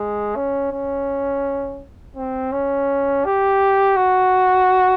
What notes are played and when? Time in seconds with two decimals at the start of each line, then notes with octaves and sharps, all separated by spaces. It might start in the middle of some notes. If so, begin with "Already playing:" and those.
Already playing: G#3
0.36 C#4
0.72 C#4
2.17 C4
2.52 C#4
3.25 G4
3.96 F#4